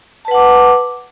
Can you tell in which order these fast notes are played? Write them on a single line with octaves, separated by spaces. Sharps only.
A5 B4 F#5 D6